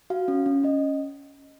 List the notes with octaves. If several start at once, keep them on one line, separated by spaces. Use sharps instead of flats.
F#4 F5
C#4
C#4
C#4 D#5